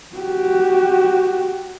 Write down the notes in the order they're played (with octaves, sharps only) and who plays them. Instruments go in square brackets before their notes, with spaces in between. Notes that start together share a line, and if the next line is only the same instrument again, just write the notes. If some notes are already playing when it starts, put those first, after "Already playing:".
[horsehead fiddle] F#4 G4